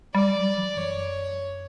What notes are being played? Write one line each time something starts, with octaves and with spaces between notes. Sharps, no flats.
G3 D5
F#3
E3
F#2 C#5